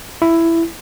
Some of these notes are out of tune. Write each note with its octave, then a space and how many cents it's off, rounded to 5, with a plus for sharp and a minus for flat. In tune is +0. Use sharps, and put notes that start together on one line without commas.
E4 +10